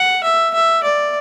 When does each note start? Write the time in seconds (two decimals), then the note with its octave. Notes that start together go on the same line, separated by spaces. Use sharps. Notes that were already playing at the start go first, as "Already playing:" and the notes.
Already playing: F#5
0.24 E5
0.54 E5
0.83 D5